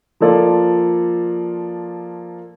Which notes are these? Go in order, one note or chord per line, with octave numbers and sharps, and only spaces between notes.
F3 A#3 F4 A4 D5